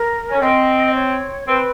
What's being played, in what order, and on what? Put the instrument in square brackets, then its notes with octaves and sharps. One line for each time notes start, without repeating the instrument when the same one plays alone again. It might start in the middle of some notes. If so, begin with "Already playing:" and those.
Already playing: [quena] A#4
[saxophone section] C#4
[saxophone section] C4 [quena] D#5
[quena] C#5
[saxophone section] C4 [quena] B4